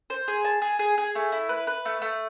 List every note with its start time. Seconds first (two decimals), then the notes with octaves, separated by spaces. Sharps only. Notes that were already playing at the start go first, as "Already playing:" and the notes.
0.10 C5
0.28 G#4
0.45 A5
0.62 G#4
0.79 G#4
0.98 G#4
1.15 A3
1.32 E4
1.49 B4
1.67 B4
1.85 A3
2.02 A3